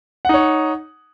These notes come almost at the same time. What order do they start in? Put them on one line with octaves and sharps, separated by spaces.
F#5 D#4 C#5